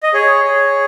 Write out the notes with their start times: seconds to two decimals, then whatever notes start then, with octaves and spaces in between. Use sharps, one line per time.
0.03 D#5
0.13 G#4 C#5
0.44 G#4